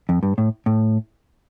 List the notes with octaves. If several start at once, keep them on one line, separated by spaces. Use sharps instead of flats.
F2
G2
A2
A2